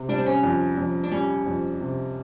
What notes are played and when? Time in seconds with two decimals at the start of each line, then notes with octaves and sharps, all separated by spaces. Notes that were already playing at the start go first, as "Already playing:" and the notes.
Already playing: C3
0.09 G3 D4
0.18 C4
0.26 C#4
0.43 F2
0.78 F2
1.04 D4
1.12 G3 C#4
1.46 F2
1.81 C3